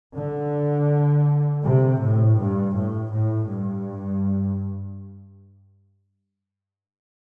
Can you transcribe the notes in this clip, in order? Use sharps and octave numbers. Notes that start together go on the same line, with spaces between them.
D3
C3
A2
G2
A2
A2
G2